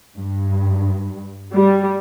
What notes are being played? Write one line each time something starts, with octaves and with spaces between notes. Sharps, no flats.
G2
G3